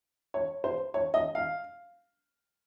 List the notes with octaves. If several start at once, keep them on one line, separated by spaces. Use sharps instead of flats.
C#5
C5
C#5
D#5
F5